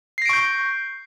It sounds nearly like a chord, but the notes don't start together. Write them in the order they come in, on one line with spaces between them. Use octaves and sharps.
C7 A#6 D7 C#6 G6